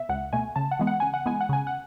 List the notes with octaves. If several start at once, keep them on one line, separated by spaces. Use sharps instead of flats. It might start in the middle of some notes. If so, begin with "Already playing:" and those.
Already playing: B2 E5
C#2 F#5
B2 A3 G#5
C#3 A5
F#5
E3 G#3 B3
F#5
C#3 G#5
F#5
E3 G#3 B3 G#5
F#5
C#3 G#5
F#5